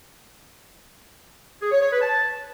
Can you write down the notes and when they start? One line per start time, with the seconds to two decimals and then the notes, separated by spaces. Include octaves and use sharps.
1.61 G#4
1.71 C#5
1.81 C#5
1.91 B4
2.02 A5